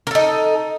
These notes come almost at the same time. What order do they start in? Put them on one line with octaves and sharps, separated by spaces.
A#4 A4 D#4